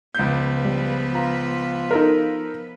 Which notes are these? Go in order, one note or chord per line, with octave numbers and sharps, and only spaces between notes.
C#2 F3 B3 B4 G6
G3
F4 A#5
D#4 A4 A#4